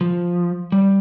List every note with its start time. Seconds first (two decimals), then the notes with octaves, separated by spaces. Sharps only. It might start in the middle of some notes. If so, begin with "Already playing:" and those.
0.01 F3
0.72 G3